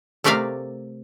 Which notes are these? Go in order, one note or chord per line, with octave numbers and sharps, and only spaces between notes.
C3 A3 A#4 D5 E5 F5